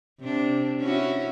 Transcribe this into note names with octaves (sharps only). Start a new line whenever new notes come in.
C3 D4
C#4 E4 F#4